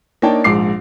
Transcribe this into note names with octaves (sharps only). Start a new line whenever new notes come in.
A#3 D4 D#4 C#5 G5 A5
A#1 G#2 D6 C7